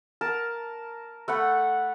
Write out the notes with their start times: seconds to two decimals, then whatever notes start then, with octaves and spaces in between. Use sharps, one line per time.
0.21 A#4 A5
1.28 A3 F#5 B5